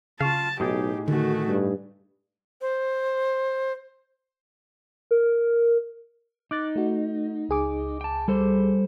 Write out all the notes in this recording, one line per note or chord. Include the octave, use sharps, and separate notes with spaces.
C#3 F4 F5 A5 C#6
B1 A2 D#4 G4 G#4
D3 D#3 A3 F#4
G2
C5
A#4
D#4 D6 F#6 A6
A3 F#4
C#2 G#4 D6
G5 A5
G3 A4 C5